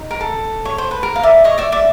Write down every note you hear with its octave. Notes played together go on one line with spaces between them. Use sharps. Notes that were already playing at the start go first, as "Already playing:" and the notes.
Already playing: D#4
A#4
A4
C#5
C5
B4
A#4
F5
D5 E5
C#5 D#5
D5 E5
D5 E5